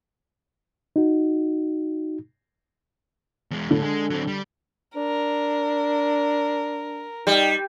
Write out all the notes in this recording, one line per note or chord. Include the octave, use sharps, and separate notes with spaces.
D#4 F#4
E2 G#3
A2 D3
G#3
F#3 C4
G3
D4 A#4
G3 D#4